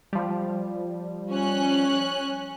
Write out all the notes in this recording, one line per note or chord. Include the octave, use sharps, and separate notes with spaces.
F3 G3
C#4 F#6